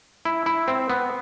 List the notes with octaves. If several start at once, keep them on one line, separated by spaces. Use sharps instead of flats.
E4
E4
C4
B3